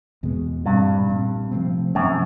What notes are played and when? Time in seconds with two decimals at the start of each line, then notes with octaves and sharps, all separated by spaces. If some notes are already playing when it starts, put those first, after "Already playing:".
0.23 E2 B2 G#3
0.66 G2 A#2 G3 C4
1.09 A#2 G3 C4
1.51 C3 F3 A3 C4
1.95 F#2 C3 F3 A3 C4